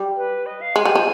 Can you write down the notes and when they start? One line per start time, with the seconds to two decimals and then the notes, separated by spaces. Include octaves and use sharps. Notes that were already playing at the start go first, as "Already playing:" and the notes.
Already playing: G3
0.17 B4
0.46 D#5
0.61 F5
0.76 G#3 G#5
0.85 G3
0.95 F3